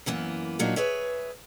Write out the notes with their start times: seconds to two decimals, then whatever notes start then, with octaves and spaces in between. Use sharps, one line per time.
0.06 F#2 E3 A#3 B3
0.59 A#2 F3 F#3 A#3 D4 D#4
0.76 G#4 B4 C#5 E5